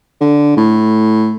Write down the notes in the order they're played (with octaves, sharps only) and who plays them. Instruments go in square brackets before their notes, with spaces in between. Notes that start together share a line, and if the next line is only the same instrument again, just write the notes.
[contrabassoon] D3
A2